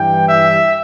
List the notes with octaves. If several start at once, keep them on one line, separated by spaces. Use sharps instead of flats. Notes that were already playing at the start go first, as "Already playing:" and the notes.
Already playing: G2 E3 G3 G5
E5